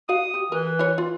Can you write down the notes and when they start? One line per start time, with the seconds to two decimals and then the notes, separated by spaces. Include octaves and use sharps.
0.09 F#4 F5 D#6
0.34 G4
0.52 E3 A#4
0.79 E4 A#4 C#5
0.98 F4